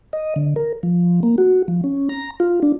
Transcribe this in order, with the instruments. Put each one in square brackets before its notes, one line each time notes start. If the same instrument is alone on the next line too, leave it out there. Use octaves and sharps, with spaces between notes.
[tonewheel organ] D#5
D3
A#4
F3
A#3
F#4
F3
C#4
A#5
F4
D4